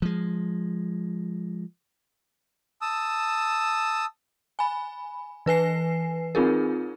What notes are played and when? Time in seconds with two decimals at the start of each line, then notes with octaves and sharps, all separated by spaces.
0.02 F3 G#3
2.82 A5 D#6 E6
4.59 G#5 B5
5.46 E3 B4 G#5 C7
6.35 C4 D#4 F4 G#4 A#4